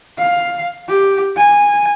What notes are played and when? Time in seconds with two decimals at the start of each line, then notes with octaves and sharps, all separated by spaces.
0.19 F5
0.89 G4
1.36 G#5